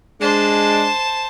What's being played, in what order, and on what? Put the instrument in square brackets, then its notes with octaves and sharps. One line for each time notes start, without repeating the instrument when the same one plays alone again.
[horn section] G#3 D4 [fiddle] C5 A5